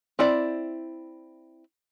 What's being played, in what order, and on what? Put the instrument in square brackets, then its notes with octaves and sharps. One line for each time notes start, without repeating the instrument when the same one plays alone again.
[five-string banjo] C4 E4 D5